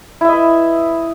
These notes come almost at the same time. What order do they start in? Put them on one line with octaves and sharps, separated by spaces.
E4 E5 D#5 B4